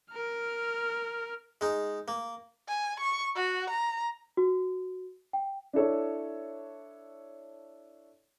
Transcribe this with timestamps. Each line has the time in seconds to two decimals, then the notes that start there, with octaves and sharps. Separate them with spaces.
0.11 A#4 F6
1.61 G#3 D#4
2.08 A#3
2.68 G#5
3.00 C#6
3.36 F#4
3.70 A#5
4.37 F#4
5.33 G5
5.73 D4 E4 A4 C#5